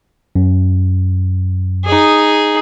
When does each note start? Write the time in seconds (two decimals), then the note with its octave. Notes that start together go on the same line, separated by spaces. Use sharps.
0.35 F#2
1.85 D#4 G#4